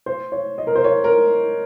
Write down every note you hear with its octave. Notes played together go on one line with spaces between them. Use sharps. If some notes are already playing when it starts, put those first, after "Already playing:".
C5
C#5
D#5
A#4
C5
C#5
A#4